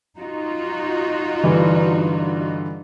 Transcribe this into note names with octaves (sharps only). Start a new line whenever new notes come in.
D#4 F4 F#4
G2 D3 E3